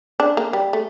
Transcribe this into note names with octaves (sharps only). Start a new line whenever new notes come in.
D4
A#3
G3
A3